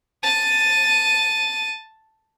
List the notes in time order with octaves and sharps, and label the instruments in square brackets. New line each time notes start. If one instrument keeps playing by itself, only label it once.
[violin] A5 D#7